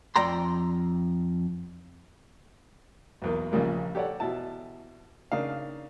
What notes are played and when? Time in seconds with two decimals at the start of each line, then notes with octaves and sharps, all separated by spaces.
0.16 F2 D5 G5 A#5 C6
3.22 B1 E2 A#3
3.52 A#1 A#2 C#3 G3 A#3
3.95 G4 A4 C#5 D5 F#5
4.20 B2 E3 E4 A5
5.32 C#3 A#3 D4 D#4 F5